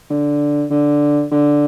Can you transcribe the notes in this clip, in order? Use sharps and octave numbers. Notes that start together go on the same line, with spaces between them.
D3
D3
D3